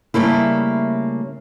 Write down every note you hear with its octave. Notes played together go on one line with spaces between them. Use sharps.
C#3 G3 A3 A#3 E4